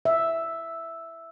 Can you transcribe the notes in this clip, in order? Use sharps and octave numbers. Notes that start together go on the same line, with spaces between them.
E5